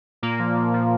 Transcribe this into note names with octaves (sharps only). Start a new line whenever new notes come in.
A#2 A#3
F3
F3
F3